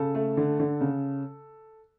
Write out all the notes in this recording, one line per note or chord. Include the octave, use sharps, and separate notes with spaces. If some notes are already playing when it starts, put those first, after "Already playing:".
Already playing: C#3 A4
A3
D3
D3
C#3